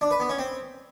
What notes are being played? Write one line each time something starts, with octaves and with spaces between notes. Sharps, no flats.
D4
B4
B3
C#4
C4